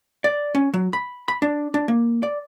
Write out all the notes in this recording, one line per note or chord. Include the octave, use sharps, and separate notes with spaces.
D5
C#4
F#3
B5
B5
D4
D4
A#3
D5